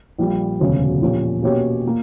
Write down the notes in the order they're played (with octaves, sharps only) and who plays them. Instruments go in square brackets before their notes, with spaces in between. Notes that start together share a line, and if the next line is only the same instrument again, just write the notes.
[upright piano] A#1 A#2 G3 A#3
E1 D2 C#3 F#3
A#1 A#2 A#3 C#4 G4
B2 A#3 C#4 G4 C#5
A#2 A#3